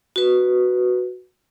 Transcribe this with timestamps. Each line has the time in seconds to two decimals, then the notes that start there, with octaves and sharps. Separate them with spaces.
0.16 F#4 B4